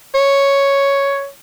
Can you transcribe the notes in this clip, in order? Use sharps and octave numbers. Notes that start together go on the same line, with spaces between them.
C#5